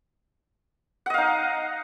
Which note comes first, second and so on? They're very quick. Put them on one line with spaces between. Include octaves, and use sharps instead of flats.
F#5 D#5 F5 D#4